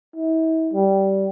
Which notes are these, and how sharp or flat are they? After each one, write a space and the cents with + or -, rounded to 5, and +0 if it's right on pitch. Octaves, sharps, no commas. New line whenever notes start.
E4 -40
G3 -15